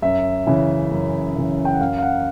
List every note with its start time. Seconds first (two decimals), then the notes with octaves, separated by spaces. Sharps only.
0.02 F#2 E5
0.47 C#3 E3
0.92 F#2
1.36 C#3 E3
1.65 G5
1.73 F#5
1.81 F#2 F5
1.98 F5
2.02 F#5